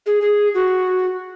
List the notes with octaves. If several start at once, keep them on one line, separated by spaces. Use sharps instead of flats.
G#4
G#4
F#4